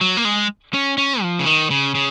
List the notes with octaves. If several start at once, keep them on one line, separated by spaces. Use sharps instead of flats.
F#3
A#3
G#3
C#4
C#4
F3
C#3
D#3
C#3
C#3